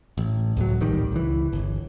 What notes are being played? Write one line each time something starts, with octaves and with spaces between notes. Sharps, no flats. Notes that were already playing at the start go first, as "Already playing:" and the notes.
A1
C#2 A2 F#3
D1 A#1 D#3 G3
C#2 E3
G1